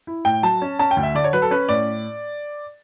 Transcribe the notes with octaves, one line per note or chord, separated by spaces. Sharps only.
E4
A2 G5
F#3 A5
C#4
C#4 A5
G5
D2
E5
D3 D5
C#5
F#3 B4
A4
C#4 B4
A2 D5